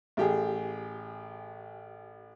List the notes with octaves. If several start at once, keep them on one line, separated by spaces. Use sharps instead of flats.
A1 G4 G#4